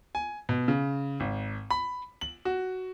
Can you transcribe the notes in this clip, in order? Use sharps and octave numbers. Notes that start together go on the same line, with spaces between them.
G#5
B2
C#3
G#1
B5
F#7
F#4